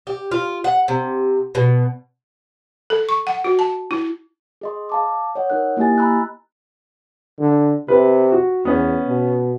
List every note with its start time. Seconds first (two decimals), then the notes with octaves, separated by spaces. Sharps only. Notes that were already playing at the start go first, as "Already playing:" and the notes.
0.07 G4
0.31 F4
0.64 F#5
0.88 C3
1.55 B2
2.90 A4
3.09 C#6
3.27 F#5
3.44 F#4
3.59 A5
3.91 E4
4.61 G#4 D#5 C6
4.89 F5 A5 D6
5.35 C#5 D#5 F#5
5.50 D#4 A#4 F#6
5.77 A#3 E4 G4 D#5 G#5 A6
5.98 A#5 B5 E6 F#6
7.39 D3
7.88 C3 B4
8.32 F#4
8.65 E2 B3 C#4
9.06 B2